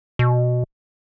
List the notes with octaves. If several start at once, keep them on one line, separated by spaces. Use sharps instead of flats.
B2